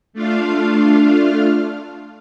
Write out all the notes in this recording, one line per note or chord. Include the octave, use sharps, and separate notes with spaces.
A3 D4 F4 F5